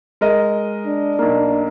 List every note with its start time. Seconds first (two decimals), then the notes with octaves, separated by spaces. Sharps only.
0.21 G#3 A#4 D#5
0.87 D4
1.19 B1 A#3